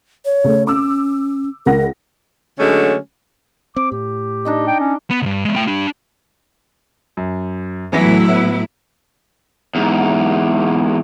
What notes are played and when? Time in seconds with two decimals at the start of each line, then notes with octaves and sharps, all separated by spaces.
0.25 C#5
0.44 C#3 A3
0.67 C#4 D6 E6
1.66 C#2 A#4 F#5 A#6
2.59 D3 F#3 G#3 A3 C#4
3.76 C4 D6
3.92 A2 G4
4.45 D4 D#4 D#5
4.67 G5
4.80 C#4
5.10 B3
5.22 C#2 G2
5.45 G#3 B3
5.56 A3 G5
5.68 G3 D4
7.17 F#2
7.93 A2 E3 F#3 B3 E4 A#6
8.25 B3 E6
9.75 E2 G#2